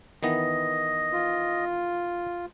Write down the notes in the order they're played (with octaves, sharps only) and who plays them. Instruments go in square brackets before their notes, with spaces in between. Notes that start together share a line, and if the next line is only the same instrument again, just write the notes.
[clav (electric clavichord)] D#3 E3 B3 [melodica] D#5
[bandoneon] F4